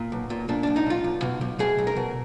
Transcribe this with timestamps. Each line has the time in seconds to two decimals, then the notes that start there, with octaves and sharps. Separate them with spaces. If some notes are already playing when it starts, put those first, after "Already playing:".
Already playing: A#2
0.12 B1
0.30 A#2
0.49 A#2 D4
0.63 B1 D4
0.76 D#4
0.86 B1 F4
1.04 B1
1.22 B2
1.41 B1
1.59 B2 G#4
1.78 B1
1.87 A#4
1.96 B2